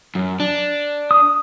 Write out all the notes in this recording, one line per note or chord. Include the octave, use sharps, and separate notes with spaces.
F#2
D4
D#6